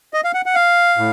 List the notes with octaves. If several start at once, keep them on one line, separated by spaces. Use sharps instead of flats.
D#5
F5
F#5
F#5
F5
A2